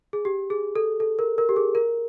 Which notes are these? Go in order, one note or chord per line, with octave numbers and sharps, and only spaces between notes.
G#4
G4
G#4
A4
A4
A#4
A#4
G4
G#4
A#4